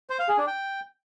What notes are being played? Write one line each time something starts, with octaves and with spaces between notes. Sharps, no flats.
C5
F5
G#4
D4
G5